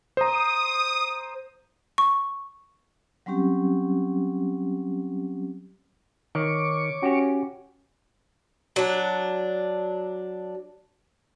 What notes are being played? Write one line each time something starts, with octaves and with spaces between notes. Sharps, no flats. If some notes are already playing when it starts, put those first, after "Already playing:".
C5 A#5 D#6
C#6
F#3 G3 C4 C#4 G4
D#3 C#5 C#6 D6
C#4 F#4 G4
F#3 D4